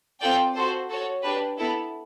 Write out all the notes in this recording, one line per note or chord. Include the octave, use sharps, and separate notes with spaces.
C4 F4 A4 D5 G5
F#4 A4 C5
F#4 A4 C#5
D4 G4 B4
B3 E4 A4